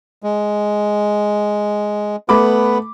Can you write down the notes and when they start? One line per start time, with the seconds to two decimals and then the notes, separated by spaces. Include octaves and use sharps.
0.23 G#3
2.29 A3 B3 B4 B5 D6